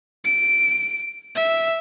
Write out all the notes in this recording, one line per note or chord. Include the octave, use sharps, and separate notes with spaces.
D7
E5